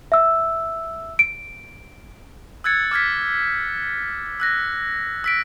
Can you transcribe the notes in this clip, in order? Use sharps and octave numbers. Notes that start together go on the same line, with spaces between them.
E5 E6
D7
E6 F#6 G#6 A6 C#7
D6 F6 G#6 B6
E6 F#6 A#6
E6 B6 D7